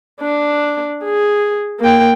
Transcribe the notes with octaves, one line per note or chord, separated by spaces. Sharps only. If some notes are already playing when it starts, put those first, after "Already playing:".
D4
G#4
A#3 G5